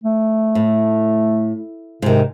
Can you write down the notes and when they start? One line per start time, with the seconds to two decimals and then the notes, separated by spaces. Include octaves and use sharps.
0.04 A3
0.55 A2
2.02 G#2 C3 D#3